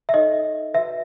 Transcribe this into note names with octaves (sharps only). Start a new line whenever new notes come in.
E5
D#4 A4 C#5 D#5
F#4 B4 E5